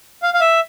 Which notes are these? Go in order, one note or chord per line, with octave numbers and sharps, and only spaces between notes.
F5
F5
E5